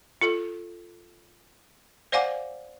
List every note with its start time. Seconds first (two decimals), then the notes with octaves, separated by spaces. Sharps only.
0.21 F4 A4
2.12 C5 D5 F5 F#5 G#5 D6